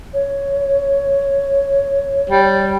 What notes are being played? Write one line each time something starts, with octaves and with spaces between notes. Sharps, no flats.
C#5
G3